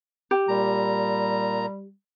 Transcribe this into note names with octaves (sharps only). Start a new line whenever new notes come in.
G4
A#2 G3 A#5